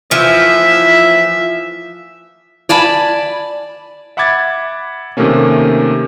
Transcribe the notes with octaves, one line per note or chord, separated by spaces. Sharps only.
E3 F3 E5
D5 G#5 A5 B5
E5 F#5 B5 D6 G#6 A6
C3 D#3 A3 A#3 C#4